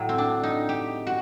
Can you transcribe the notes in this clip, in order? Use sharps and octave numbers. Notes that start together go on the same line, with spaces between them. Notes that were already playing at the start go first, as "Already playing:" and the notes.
Already playing: A2 F#3
C4
D4
D#4
G4
F#4